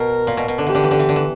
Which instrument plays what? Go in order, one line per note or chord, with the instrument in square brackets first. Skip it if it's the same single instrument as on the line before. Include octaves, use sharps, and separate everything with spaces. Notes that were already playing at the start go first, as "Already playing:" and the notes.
Already playing: [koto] B2 [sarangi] A#4
[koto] A#2
B2
B2
D3
[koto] E3 [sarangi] G4
[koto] D3
E3
D3
E3
D3
E3